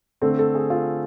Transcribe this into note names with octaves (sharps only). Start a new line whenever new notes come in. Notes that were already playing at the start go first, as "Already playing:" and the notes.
D3 A3 C4 A4
A4
G#4
F4